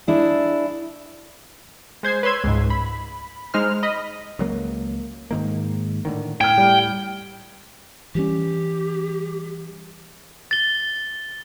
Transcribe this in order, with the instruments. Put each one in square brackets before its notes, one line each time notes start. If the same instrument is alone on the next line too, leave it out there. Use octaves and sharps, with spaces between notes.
[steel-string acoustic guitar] D4 E4 G#4
[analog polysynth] G#3 C5 G#6 C7
B4 C#5 C6 E6 G#6
C#2 G#2
B5
G#3 D#4 C5 F6
D#5 B5
[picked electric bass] C#2 F#3 A#3
G#2 D#3 A#3
A2 D3 D#3
[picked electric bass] A2 [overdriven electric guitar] G5 [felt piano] F6 G#6
[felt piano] G3
[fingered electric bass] E3 G3 C#4 [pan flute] G4
[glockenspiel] A6 G7